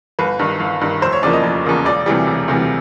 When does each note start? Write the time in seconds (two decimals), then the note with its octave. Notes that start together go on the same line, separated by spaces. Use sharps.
0.19 G1 B4
0.39 G2 D#3
0.60 G1
0.81 G2 D#3
1.02 F1 C5
1.13 C#5
1.23 E2 C#3 F3 A#3 D5
1.33 D#5
1.44 F1
1.65 E2 C#3 F3 A#3
1.85 E1 D5
2.06 D2 C3 E3 G3
2.27 E1
2.48 D2 C3 E3 G3